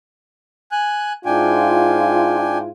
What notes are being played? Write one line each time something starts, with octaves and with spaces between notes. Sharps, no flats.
G#5 F#6
G#2 D4 E4 F4 G5 G#5